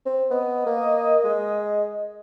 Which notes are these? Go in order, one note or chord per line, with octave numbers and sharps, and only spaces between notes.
C4
B3 D#5
A#3
G#3